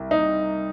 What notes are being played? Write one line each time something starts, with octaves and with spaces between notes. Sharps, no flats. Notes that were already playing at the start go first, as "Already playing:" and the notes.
Already playing: C2
D#4